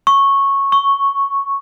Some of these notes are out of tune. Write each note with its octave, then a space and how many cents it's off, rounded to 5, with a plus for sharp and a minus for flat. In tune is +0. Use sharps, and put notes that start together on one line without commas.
C#6 -10
C#6 +0